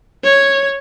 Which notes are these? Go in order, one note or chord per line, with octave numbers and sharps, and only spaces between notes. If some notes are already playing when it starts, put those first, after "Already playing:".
C#5